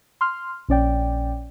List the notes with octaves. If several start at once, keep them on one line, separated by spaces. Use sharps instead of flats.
C6 F6
A#1 C#4 D5 G5